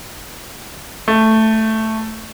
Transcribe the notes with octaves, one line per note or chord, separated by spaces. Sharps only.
A3